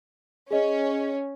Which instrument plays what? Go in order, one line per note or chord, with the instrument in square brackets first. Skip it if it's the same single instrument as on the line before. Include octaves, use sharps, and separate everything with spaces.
[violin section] C#4 [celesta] G#4 D#5